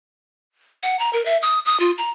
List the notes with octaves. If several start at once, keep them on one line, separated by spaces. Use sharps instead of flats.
F#5
A#5
A#4
E5
D#6
D#6
F4
A#5